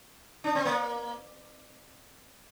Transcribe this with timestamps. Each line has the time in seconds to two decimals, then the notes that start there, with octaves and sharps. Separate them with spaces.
0.44 D4
0.55 C4
0.65 A#3